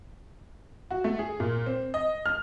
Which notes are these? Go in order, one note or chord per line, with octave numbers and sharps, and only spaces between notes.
F#4
A3
G#4
A#2
C4
D#5
F6